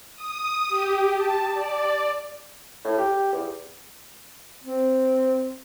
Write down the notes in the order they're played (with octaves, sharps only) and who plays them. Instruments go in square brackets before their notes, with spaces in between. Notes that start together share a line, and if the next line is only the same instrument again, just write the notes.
[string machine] D#6
G4
A5
D5
[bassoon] A2
G4
E2
[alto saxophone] C4